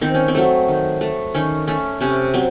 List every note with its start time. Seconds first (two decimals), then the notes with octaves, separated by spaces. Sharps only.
0.01 D#3 C4
0.14 C#4
0.28 C4
0.35 F#3 A3
0.68 D#3
1.01 A3
1.34 D#3 C#4
1.67 A3 C#4
2.01 C3 C#4
2.34 F#3 C4